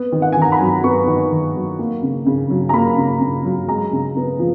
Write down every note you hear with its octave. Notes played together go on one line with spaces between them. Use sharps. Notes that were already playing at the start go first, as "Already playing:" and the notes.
Already playing: B3
D#3
F#5
D#3 G#5
A#5
B5
F#3
B3 C#6
D#3
D#3
F#3
A#3
C#3
C#3
F#3
A#5
A#3 B5
C#3
C#3
F#3
G#3 A#5
C#3
B3
F3